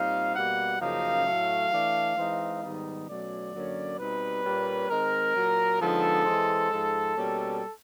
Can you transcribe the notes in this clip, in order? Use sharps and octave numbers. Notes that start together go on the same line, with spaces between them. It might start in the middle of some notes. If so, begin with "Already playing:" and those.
Already playing: A#2 G3 C4 D#4 F5
B2 G3 A#3 F#5
F#2 C#3 F3 A#3 D#4 F5
A2 F#3 A3
E3 A3 D4
E3 G#3 C4 D#4
G#2 D#3 G3 B3 D#4
B2 F#3 A3 C#4 D5
F#2 D3 F#3 A#3 C#4
B2 G3 C4 D#4 B4
A#2 G3 A#3 C#4
D#3 G#3 C4 A#4
A#2 F#3 A#3
D3 F3 G#3 B3 D#4 A4
E3 G#3 C4
G#2 F3 G#3
B2 G3 A#3 C#4